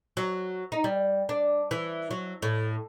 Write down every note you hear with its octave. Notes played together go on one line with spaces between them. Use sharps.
F#3
D#4
G3
D4
E3
F#3
A2